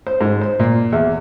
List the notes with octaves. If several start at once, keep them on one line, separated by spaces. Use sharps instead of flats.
C5
G#2
C5
A#2
E2